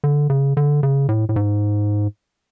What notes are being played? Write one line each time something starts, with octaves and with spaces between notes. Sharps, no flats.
D3
C#3
D3
C#3
A2
A2
G#2